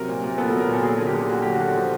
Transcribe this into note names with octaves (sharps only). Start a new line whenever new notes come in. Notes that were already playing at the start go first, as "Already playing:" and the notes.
Already playing: C3 F#3 A#4
A#2
A#2
B3 A4
F#3 A4
A#4
A#2 A4
F#3 G#4
D3 G#4
G4
D3
A#3 F#4
F#3 G4
F#4
D3
F3